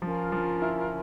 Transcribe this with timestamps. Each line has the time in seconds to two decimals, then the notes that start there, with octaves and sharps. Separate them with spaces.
0.02 F3 C#4 F4 A#4
0.32 F3
0.62 E4